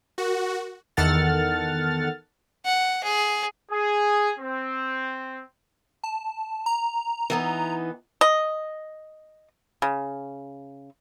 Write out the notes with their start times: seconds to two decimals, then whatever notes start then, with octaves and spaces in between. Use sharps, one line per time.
0.18 F#4 A#4
0.97 E2 D#3 A4 F#5 F6 A6
2.65 F#5
3.04 G#4
3.71 G#4
4.40 C4
6.04 A5
6.66 A#5
7.30 E3 B3 D#4
8.21 D#5
9.82 C#3